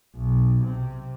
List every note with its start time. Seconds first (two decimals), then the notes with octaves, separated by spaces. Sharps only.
0.16 B1
0.63 C3